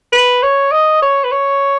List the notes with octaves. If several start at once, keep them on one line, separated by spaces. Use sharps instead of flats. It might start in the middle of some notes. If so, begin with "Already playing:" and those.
B4
C#5
D#5
C#5
B4
C#5